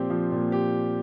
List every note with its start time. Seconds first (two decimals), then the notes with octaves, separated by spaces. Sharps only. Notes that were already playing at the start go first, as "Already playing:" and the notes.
Already playing: A#2 F3 C4 G4
0.10 F3
0.32 A#2
0.52 G4